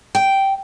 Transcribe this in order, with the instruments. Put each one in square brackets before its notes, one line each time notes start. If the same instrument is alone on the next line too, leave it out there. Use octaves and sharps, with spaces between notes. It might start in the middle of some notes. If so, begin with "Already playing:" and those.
[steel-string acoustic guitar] G5